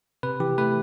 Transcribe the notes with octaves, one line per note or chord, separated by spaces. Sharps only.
C3 B4
E3 G4
A3 B4